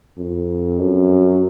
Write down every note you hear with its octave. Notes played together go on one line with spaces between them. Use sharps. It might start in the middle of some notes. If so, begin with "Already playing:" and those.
F2
F#2